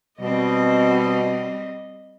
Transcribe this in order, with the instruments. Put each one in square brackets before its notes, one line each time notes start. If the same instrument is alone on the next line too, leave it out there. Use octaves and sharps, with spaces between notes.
[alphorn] B2 [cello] G3 C4 [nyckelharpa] D#5